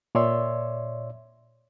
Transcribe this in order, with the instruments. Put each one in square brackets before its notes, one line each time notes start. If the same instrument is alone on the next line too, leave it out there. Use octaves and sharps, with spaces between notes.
[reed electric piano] A#2 C#5 D5 E5 C6 E6